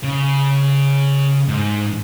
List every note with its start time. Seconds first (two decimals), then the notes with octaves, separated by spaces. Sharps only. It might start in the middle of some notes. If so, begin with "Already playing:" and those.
0.03 C#3
1.49 G#2